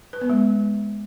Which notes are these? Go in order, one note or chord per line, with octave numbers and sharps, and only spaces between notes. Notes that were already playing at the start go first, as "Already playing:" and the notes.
B4
B3
G#3